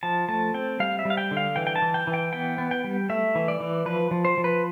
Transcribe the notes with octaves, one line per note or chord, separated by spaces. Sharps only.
F3 A5
A3 A5
C4 G5
G3 F5
E5
G3
F5
G5
D3
F5
E3 G5
G5
A5
E3
G5
E3
G5
B3 G5
B3
G5
G3
A3 E5
E3
D5
E3
F3 B4
F3
C5
F3
B4